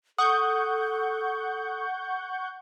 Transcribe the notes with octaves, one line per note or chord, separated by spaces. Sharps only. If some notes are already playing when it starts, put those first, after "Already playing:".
A4 F#5 C#6 D#6 G6